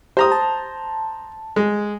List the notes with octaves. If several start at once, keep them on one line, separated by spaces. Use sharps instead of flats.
G4 C5 A#5 D#6
A5
G#3